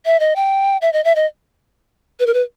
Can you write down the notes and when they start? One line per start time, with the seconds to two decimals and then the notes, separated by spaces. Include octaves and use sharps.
0.05 E5
0.20 D#5
0.36 G5
0.82 E5
0.93 D#5
1.04 E5
1.16 D#5
2.20 B4
2.26 A#4
2.34 B4